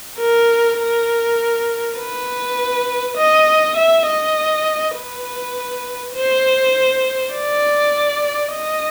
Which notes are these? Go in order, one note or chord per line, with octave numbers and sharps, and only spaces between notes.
A#4
A#4
B4
D#5
E5
D#5
B4
C5
D5
D#5